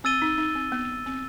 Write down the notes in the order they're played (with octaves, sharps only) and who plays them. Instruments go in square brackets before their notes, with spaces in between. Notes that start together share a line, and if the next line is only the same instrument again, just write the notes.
[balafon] C4 [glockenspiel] E6 A6 D#7 G7
[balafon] D#4
D#4
C4
B3
C4